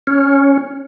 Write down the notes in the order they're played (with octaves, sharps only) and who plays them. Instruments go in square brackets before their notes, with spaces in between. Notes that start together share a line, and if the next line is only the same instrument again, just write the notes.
[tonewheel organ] C#4